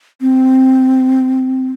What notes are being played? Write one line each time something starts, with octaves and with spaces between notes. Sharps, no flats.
C4